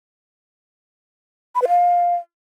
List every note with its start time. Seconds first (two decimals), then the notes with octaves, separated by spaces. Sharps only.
1.55 B5
1.62 B4
1.68 F5